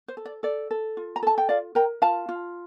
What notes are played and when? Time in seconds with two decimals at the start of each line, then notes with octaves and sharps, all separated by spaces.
0.08 C5
0.17 A4
0.25 D5
0.43 A4 D5
0.71 A4
0.97 F4
1.16 A#5
1.23 A4 A5
1.38 G5
1.49 F4 D5 F5
1.75 A#4 G5 A#5
2.02 F4 F5 A5
2.29 F4